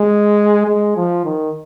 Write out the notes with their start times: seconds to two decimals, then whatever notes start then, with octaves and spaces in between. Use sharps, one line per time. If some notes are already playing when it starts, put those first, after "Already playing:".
Already playing: G#3
0.67 G#3
0.96 F3
1.25 D#3